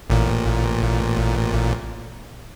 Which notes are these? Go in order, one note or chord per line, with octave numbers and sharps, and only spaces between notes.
A1 A#2